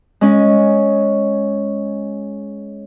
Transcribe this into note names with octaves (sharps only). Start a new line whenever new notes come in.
G#3 C#4